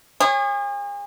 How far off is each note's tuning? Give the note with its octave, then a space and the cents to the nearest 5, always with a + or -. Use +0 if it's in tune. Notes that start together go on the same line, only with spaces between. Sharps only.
G#4 -40 C#5 -25